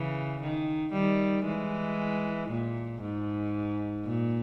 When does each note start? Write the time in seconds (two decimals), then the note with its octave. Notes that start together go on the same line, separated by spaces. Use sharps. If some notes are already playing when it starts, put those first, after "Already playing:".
Already playing: C#3 E3
0.41 D#3
0.93 D#3 G3
1.45 E3 G#3
2.49 A#2
3.02 G#2
4.05 A#2